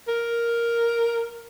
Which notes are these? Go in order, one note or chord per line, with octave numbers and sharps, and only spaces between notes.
A#4